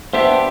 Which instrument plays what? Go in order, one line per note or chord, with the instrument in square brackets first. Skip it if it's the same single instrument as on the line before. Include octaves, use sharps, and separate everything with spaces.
[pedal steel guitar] B3 D4 G4 [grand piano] C5 E5